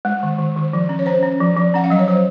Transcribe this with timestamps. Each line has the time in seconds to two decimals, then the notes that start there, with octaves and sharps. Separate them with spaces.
0.05 G#3
0.23 D#3
0.39 D#3
0.56 D#3
0.73 F3
0.89 C#4
0.99 C#5
1.06 C#4 C5
1.23 C#4
1.40 F3
1.57 F3
1.74 C#4 F#5
1.84 F5
1.90 F#3 D#5
1.99 C#5
2.08 F#3 C5